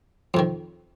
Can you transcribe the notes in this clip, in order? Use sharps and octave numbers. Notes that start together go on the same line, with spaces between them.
F2 C3 D#3